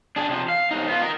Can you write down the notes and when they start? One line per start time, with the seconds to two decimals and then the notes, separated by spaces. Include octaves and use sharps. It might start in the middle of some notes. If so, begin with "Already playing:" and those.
0.16 D4 G#4
0.29 C3 F3
0.48 F5
0.71 C2 D#4
0.88 B3 F4
1.02 D#4 A#4